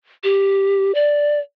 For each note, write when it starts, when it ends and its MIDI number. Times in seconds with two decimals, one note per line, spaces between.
0.24 0.92 67
0.95 1.39 74